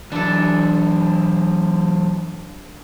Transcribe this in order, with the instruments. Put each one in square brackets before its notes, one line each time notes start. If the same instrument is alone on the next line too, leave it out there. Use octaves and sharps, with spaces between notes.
[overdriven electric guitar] E3 F#3 [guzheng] D4 A4